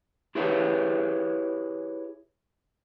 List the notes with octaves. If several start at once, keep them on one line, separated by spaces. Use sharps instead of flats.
E4 G4 G#4 B4 C#5 E5